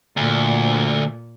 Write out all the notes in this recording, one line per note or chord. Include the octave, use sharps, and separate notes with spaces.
D2 A#2